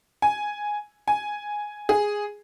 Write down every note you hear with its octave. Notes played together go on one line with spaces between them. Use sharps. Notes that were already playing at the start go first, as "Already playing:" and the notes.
G#5
G#5
G#4